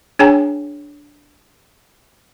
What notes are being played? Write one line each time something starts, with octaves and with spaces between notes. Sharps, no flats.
D4 G#4 C#5 G5 G#5 A#5